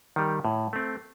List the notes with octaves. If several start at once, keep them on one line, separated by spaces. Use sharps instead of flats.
D#3 G3
A2
A3 C4